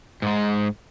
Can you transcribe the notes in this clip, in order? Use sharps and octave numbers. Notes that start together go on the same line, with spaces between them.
G#2 G#3